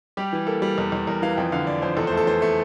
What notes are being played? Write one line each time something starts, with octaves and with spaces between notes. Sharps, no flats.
G3 G4
E3
A#3 A4
G3
E2
E2
E2 A#4
E3 F5
F2 G5
D3 F5
D3 D5
F2 C5
E2 A4
C5
A3
A4
E3 C5
A3